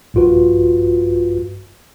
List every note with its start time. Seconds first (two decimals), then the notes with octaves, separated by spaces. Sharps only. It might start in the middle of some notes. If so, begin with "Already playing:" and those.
0.14 A#1 G2 F4 F#4 B4